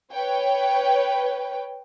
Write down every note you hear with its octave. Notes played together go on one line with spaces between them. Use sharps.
B4 C#5 G5